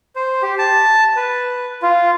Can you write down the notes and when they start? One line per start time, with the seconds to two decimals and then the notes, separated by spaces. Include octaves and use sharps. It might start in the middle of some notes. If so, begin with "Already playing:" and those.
0.16 C5
0.42 G4
0.59 A5
1.16 B4
1.82 F4